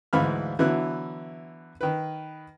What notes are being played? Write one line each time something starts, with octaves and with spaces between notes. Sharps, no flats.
D2 G#2 E3 F5 B5 F6
D3 E3 F#3 B3 E4 F#6
D#3 B4